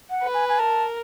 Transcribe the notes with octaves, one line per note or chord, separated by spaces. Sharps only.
F#5
B4
G#5
G#5
A#4 A5